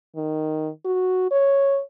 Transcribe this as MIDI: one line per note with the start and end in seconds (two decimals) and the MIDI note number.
0.16 0.69 51
0.85 1.27 66
1.31 1.81 73